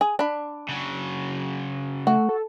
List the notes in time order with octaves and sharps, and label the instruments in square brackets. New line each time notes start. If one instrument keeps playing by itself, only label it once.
[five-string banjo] G#4
D4 B5
[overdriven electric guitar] C#3 F#3
[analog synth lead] A3 [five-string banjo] F#4
[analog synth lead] A4